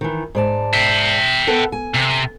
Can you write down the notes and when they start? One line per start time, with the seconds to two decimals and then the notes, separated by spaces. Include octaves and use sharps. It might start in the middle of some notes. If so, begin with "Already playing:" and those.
0.01 D#3 E3
0.35 G#2 D5 A5
0.74 E5 G5
1.47 B3 A4 B4
1.72 G#5
1.95 C3